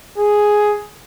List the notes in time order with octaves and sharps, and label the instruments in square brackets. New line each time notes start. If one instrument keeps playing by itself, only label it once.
[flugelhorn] G#4